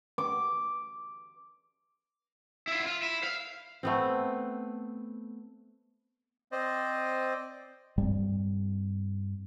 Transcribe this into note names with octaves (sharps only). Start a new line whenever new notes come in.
D6
E4 F4
F4
E4
F5
A3 B3 C4
C4 C5 D5 D#5
G2 G3 C4